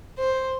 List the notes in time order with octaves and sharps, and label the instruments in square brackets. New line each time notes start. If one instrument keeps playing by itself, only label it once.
[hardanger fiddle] C5